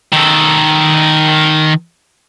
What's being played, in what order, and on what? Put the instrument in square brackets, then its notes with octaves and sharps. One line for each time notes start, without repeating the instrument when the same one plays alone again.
[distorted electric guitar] D#3 A4